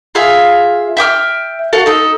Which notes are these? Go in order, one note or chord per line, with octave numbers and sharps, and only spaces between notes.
F4 G#4 E5 F5
E5 G5 D6 F6
F#4 A4 F5 A5
D#4 A4